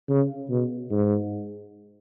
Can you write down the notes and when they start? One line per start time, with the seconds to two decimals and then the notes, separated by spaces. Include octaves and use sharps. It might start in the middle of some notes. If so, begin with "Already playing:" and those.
0.10 C#3
0.50 B2
0.91 G#2